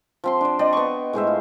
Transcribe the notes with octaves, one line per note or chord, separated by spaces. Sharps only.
F3 C4 C6
D4 D5
D5 D#5 G5 C6
B3 C#6
A2 G#3 C5 E5
F4